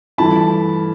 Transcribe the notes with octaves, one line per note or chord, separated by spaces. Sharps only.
G2 E3 A3 A5 B5